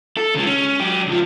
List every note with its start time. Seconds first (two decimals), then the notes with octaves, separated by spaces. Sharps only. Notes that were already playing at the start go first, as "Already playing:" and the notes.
0.17 A4
0.35 C#3 G#3
0.46 C#4
0.80 F#3 G4
1.07 C#2 F3